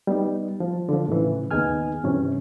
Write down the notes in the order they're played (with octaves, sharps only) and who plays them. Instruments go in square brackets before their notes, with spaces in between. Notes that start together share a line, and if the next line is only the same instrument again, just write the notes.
[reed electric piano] G3 B3 D#4
F3
D3 F3
A2 C#3 E3
D#2 B3 D#4 G#4 G#5 F6
G2 C3 E3 C#4